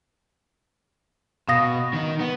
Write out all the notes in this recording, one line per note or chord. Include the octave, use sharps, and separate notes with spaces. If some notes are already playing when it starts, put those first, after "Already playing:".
B2 F5 D#6 A#6
D#3 D#4
B3